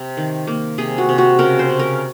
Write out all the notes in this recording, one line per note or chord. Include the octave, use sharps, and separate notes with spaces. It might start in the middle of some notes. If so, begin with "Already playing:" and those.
Already playing: C3
D#3
A#3
C3 G#4
F#4
C3
F#4
C#3 A#4
C5
C#3
A#4